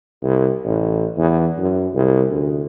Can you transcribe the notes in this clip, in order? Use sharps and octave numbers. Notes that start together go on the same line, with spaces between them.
C2
A1
E2
F#2
C2
D2